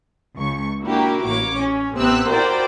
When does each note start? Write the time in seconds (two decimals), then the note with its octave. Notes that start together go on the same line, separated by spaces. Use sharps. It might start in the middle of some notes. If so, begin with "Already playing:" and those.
0.37 C#2 C#6
0.83 A#3 D4 E4 F#4 G4 A#4
1.25 A1 A#3 C#5 D6
1.56 C#4
1.97 A1 C3 B3 C4 E6 F#6
2.30 E4 F#4 A#4 C5 D5 G5